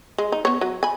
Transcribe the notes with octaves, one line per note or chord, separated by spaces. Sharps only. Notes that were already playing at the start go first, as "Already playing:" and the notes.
G#3
D#4
B3 C#5
F#3
G#5 B5